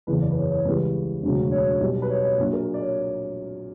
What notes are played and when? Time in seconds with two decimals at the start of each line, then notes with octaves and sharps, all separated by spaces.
0.07 F#1 E2 C#3 B4
0.21 D5
0.31 B4
0.36 C#5
0.51 C#5
0.65 C#2 C#3 E3 G3 B4
1.23 E1 D2 C#3 F#3
1.52 C#5
1.80 B1 B2 G3
2.02 B4
2.10 C#5
2.24 C#5
2.38 A#1 A#2 F#3
2.53 A#4
2.74 D5
2.82 C#5